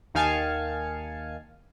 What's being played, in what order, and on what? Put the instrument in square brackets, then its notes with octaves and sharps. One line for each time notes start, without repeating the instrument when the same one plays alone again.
[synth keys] D#2 D#3 F5 G#5 A5 C#7